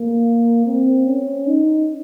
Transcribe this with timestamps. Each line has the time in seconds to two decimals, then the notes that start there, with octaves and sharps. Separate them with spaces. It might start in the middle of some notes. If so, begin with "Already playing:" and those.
Already playing: A#3
0.66 C4
1.06 C#4
1.47 D#4